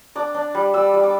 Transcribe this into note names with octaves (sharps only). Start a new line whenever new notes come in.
D4 D6
D4
G3
G3 E6
G3
D6